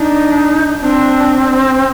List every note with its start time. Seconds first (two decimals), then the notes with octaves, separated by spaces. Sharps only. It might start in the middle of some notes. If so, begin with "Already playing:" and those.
Already playing: D4 D#4
0.81 C4 D4